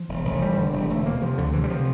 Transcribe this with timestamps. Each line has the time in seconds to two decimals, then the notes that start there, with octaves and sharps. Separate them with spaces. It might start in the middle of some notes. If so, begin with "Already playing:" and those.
Already playing: F3
0.09 E1
0.25 E1
0.42 D2 G3
0.58 D3
0.73 E1 G3
0.90 E1 A3
1.05 D2 A#3
1.22 C3 F3
1.38 D2 D3
1.53 C3 E3
1.64 G3
1.70 C3 F3